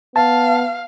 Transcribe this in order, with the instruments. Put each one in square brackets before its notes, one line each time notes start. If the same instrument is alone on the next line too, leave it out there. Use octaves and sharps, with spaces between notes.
[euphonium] B3 [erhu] F5 [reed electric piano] A5